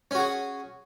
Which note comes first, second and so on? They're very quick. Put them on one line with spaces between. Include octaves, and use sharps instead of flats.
C#4 F#4 G#4